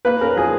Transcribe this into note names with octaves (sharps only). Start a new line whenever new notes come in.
A#3 B4
C#4 A#4
F3 G#4